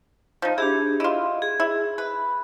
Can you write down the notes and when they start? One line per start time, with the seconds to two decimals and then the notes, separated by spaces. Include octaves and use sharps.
0.42 F3 D#4
0.58 D4 E4 G4 G#4
1.00 E4 F4 D#5
1.42 G#4
1.60 E4
1.98 B4 B5